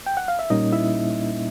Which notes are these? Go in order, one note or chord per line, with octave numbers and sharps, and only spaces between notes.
G5
F#5
F5
E5
A#2 G3 A#3 C#4 D#4 D#5
E4 E5